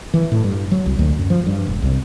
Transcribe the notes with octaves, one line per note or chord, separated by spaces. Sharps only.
E3
A2
G2
F#3
C2
D2
F#2
F3
G2
E1
C2